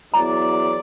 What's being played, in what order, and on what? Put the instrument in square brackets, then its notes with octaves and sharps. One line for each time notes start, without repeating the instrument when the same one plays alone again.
[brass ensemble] E2 F#3 D5 [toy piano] A#5